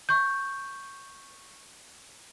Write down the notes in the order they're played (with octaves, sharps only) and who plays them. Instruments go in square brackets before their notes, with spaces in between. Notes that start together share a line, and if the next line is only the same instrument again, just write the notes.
[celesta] C#6 G6